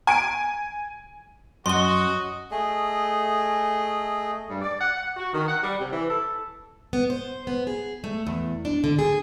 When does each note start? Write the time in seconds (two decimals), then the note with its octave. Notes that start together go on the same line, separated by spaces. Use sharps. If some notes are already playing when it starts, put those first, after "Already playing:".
0.07 G#5 D7
1.66 F#2 F#4 D#5 C6 G7
2.51 A3 G#4 D#5
4.49 G2
4.62 D5
4.80 F#5
4.97 F#5
5.16 F#4
5.34 D#3
5.48 F#5
5.63 G3
5.80 C3
5.93 E3
6.09 A4
6.93 B3
7.10 C5
7.47 B3
7.67 G#4
8.04 A3
8.27 E2
8.65 D4
8.84 D3
8.99 G#4